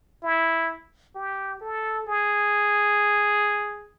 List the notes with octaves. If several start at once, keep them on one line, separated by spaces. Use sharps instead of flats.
E4
G4
A4
G#4